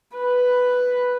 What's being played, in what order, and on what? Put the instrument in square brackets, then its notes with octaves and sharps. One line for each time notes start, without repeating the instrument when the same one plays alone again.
[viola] B4